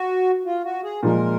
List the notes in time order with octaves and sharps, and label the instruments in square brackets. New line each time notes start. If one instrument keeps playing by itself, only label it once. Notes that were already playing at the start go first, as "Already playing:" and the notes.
Already playing: [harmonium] F#4
F4
F#4
G#4
[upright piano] A#2 F3 G#3 [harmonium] A#4